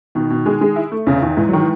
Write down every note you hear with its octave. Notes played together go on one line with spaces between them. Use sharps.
B2 D#3
B2
G#3
G#3
E4
A3
E2 C#3
E2 D#3
G#2 E3
D#3 F#3
E3